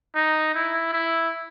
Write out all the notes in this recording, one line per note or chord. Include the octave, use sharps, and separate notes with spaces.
D#4
E4
E4